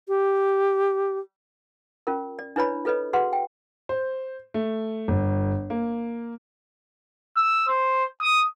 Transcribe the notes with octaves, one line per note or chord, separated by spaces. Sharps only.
G4
C#4 F4 A#4
D5
D4 E4 B4 C#5 D5 B5
F4 A4 B4 C#5 D#5
F#4 G#4 B4 F#5 C6
G5
C5
A3
G1
A#3
E6
C5
D#6